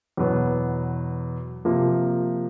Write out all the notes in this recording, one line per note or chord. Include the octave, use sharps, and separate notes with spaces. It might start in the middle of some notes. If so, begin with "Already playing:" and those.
E2 B2 F#3 B3
C3 F3 A#3